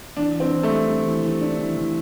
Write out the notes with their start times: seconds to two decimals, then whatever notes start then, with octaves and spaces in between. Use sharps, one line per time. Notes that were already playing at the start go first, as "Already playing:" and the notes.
0.17 E3 D4
0.35 E3
0.40 C4
0.52 E3
0.63 A3
0.70 G3
0.88 G3
1.05 E3
1.22 E3
1.41 D4
1.59 E3
1.76 E3